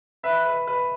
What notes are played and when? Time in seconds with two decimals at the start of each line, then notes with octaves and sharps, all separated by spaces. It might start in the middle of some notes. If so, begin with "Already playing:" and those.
0.24 B4 E5
0.45 B4
0.68 B4